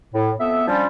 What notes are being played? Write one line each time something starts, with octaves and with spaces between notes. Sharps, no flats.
A2
F2 B3 E5
F3 G3 C#4 D4 F4